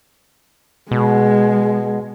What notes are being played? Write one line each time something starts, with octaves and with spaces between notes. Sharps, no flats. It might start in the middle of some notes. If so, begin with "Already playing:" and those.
B2 G#3